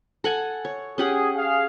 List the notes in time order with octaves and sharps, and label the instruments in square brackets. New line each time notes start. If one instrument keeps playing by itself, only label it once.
[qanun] A4 F#5 G#5
C#5
[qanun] C#4 G4 F#5 [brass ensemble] G#4
[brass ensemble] G#4 F5